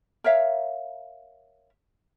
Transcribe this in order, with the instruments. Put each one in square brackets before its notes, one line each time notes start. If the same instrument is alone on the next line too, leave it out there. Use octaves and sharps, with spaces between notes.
[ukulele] A#4 C#5 E5 F5